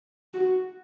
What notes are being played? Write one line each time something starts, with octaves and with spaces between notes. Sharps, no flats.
F#4